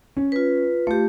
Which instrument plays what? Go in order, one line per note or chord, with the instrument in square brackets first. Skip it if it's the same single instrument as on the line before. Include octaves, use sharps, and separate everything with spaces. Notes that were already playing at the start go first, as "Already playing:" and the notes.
[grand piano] C#4
[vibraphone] F4 B4
[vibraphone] A3 G4 [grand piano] F4